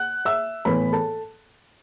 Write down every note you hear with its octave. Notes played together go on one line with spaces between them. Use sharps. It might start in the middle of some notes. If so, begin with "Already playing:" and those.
Already playing: F#5 F#6
E5 E6
A2 E3 B3 B4 B5
A4 A5